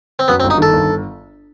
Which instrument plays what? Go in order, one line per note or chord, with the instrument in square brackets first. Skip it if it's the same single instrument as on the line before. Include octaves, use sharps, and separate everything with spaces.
[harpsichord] C4
[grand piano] F#2 [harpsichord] B3
[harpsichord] C4
[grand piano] G1
[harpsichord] D#4
[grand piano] D#3 [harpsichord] A4
[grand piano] G1